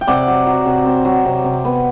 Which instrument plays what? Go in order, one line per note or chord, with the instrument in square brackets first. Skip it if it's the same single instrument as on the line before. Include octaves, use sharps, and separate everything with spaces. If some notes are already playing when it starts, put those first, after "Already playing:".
[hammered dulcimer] G5
C3 D5 F#5
F#3
F#3
C3
C4
F#3
C3
C3
B3